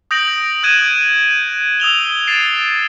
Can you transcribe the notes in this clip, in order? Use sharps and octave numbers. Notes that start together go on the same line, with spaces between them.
D#6 G6 A#6 D7 F#7
D#6 F#6 G#6 D#7 E7 F#7
G6
D#6 E6 F7 G7
A6 C7 D7 E7